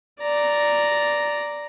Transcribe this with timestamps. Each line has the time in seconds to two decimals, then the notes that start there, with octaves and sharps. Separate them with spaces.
0.21 D5 A#5